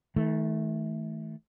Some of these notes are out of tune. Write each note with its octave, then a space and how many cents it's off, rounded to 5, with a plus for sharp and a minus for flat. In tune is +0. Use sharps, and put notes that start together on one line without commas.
D#3 +45 A3 -15